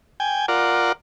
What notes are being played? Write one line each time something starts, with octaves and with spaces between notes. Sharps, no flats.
G5 G#5
F4 A#4 D5 F#5